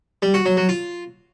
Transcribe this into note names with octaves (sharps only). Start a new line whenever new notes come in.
G3
F#4
F#3
F#3
F4